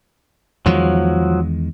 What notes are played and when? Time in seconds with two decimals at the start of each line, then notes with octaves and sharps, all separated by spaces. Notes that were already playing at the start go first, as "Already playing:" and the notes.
0.66 E2 D#3 F3 F#3 G#3